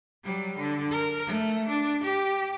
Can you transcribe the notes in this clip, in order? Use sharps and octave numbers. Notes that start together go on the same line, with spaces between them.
F#3 G3
D3
A#4
A3
D4
G4